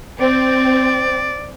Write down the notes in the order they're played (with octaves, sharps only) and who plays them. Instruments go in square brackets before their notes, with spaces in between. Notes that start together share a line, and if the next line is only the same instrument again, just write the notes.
[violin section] C4 [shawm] D5